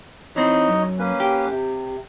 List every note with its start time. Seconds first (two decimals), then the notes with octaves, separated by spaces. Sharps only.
0.36 E3 C4 D#4 C#5 D#5
0.68 F#2
0.99 A#3 C#4 B4
1.20 G4
1.50 C3